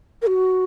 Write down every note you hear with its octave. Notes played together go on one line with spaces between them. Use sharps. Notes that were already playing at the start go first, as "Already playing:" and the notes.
A#4
F#4